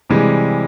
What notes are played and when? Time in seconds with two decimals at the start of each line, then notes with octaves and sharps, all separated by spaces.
0.10 C3 E3 G3 G#3